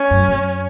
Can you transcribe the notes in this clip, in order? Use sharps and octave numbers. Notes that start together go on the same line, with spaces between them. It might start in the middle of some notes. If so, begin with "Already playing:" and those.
Already playing: C#4
F#2
F#2